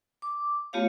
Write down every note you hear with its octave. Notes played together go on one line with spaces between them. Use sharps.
D6
A3 B3 F4 G4 C#5 F5